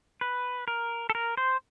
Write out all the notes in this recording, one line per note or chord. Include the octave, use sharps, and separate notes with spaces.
B4
A#4
A4
A#4
C5